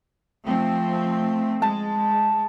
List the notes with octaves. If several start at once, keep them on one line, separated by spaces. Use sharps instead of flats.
F3 A3 C4
G#3 A5